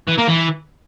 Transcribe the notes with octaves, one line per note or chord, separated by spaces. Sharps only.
E3
A#3
E3